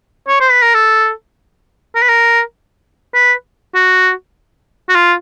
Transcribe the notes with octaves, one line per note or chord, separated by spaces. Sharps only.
C#5
C5
B4
A#4
A4
A#4
B4
A#4
B4
F#4
F#4
F4